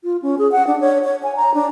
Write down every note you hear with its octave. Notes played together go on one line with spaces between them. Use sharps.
F4
C#4
G#4
F#5
D4
C#5
C#5
G#5
A#5
D4